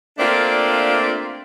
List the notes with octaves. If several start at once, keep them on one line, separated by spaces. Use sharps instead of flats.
A3 A#3 C4 D4 F4 D5